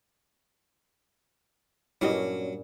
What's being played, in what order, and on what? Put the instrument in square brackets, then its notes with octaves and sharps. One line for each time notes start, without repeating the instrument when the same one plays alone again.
[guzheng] G2 A#2 C#4 [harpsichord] F#3 [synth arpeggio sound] E4 G4 D#5